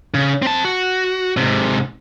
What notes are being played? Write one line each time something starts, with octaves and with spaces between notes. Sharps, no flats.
C#3
C4 A5
F#4
G#2 C3